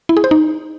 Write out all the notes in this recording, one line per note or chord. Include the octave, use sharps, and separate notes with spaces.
E4
G#4
C5
D#4